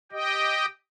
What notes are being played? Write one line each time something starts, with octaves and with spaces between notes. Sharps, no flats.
G4 D#5 G5